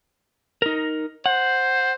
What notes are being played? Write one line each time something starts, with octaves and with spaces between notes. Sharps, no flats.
D#4 A#4
C5 F#5